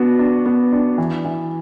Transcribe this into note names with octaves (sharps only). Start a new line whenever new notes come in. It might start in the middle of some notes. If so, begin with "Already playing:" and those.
Already playing: B3 D4 F#4
D4
B3
D4
E3
E3